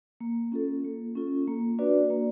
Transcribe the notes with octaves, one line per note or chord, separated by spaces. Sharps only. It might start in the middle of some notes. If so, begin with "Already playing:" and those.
A#3
C#4 F4 A4
A#3
C#4 F4 A4
A#3
D4 F#4 B4 D5
A#3